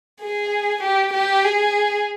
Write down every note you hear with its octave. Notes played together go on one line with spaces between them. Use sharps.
G#4
G4
G4
G#4